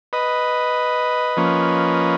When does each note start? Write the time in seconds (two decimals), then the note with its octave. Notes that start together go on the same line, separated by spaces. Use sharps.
0.13 B4 D#5
1.37 F3 A#3 C#4